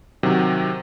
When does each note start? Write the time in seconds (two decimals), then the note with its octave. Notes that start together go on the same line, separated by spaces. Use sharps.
0.23 C3 D#3 F#3